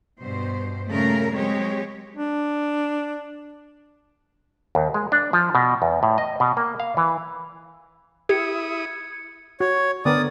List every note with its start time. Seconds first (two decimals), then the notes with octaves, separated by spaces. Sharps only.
0.18 G2 B2 C5
0.89 A#2 C#3 G3 A3 A#4
1.34 F#3 G#3 C4 G4 C#5
2.16 D4
4.75 D#2
4.94 G#3
5.12 D4
5.33 F3
5.55 B2
5.82 E2
6.03 A2
6.18 D#5
6.40 B2
6.57 A#3
6.80 F5
6.97 E3
8.29 E4 G4 D#6 G#6 C#7
9.60 F#4 C#5
10.05 D3 B3 A#4 D5 D#6